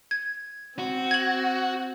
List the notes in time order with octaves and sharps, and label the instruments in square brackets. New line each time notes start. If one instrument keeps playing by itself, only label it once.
[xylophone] G#6
[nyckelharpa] C4 [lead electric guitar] F#4
[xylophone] G#6 F#7